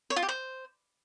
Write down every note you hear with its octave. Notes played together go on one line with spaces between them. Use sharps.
C#5
F4
G4
C5